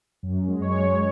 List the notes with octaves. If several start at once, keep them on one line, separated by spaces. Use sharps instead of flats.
F#2
G#3
C#5
G#3